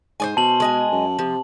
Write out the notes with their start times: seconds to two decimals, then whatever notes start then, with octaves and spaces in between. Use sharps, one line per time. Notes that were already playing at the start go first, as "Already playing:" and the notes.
0.20 G#2 C5 D5 G#5
0.37 B2 A5 F#7
0.60 G#3 D#5 G#5
0.92 F#2
1.19 C3 F3